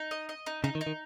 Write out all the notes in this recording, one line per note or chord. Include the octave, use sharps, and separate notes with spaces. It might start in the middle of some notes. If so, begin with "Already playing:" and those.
Already playing: D#4
D#5
D#5
D#4
C#3 D#4
D#3
D#4
D#3